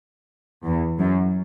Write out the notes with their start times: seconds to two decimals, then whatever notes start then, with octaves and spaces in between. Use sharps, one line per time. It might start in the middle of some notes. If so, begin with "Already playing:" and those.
0.64 E2
0.99 F#2